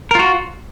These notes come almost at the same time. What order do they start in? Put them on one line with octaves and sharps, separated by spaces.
A#4 F4 F#4